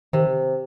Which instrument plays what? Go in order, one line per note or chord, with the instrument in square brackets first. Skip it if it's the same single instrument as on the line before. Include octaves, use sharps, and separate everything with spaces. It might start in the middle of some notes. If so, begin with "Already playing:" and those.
[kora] C3 [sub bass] D#3